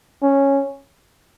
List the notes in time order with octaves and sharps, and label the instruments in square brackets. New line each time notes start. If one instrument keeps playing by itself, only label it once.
[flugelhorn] C#4